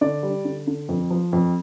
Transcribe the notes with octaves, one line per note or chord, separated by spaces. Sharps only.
D3 D5
G3
D3
D3
F2
F3
F2